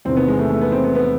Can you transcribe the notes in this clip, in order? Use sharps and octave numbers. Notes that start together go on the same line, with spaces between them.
E2 C3 D#3 C4
B3
G#3
A3
A3
B3
C4
B3
B3